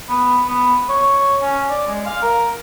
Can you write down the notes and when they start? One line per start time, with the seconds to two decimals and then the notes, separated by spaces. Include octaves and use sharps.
0.09 B3
0.48 B3
0.89 C#5
1.42 C#4
1.69 D5
1.87 G#3
2.06 F5
2.22 A#4